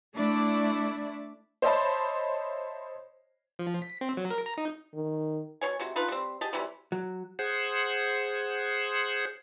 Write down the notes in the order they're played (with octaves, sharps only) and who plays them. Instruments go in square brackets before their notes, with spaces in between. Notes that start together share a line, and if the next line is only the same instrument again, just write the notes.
[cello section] A3 D4 E4 D5
[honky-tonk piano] C5 C#5 D#5 E5 A5 B5
[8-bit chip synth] F3
B6
C4
F#3
A#4
A#5
D#4
[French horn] D#3
[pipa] B2 C#5 G#5
C3 G#3 F#4
D4 D#4 F4 B4
G3 C4
G4 G#4 D#5 A5
C3 E3 F#3 G3
[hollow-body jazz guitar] F#3
[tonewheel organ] G#4 C5 F#5